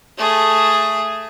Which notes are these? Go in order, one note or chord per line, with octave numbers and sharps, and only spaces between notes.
A3 G#4